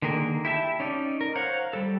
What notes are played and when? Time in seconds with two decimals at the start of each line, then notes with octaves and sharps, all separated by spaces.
0.02 D3 D#3 A#3 G#4 A#4
0.45 E4 G4 E5 A5
0.80 C#4 D#4 D5
1.21 A#4
1.36 C5 C#5 F5 F#5 A#5
1.73 G3 A4